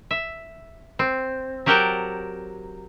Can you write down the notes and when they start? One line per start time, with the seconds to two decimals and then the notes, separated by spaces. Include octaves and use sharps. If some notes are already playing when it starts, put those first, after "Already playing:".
0.11 E5
0.99 C4
1.66 F#3 G4 A#4 F#5 G5 A5